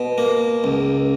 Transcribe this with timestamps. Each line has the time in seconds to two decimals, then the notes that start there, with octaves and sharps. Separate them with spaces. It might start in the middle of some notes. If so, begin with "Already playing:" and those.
Already playing: B2
0.18 A#3
0.64 C#2